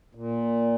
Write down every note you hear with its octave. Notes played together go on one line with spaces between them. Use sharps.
A#2